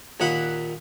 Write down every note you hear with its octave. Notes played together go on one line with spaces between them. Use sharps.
D#2 A#2 F#5 B5